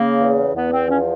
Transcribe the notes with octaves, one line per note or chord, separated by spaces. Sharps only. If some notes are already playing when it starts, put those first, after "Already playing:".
Already playing: C#3 A#3
E2
E2 B3
C4
F3 C#4